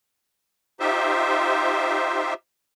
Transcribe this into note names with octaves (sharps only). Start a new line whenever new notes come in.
D#4 F4 G4 C5 E5